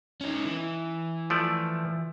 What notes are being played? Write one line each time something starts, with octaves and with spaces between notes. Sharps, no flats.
C#4 D#4
E3
F3 A3 D5